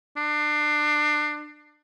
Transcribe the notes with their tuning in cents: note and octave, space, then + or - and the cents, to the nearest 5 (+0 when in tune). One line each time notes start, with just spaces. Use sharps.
D4 +25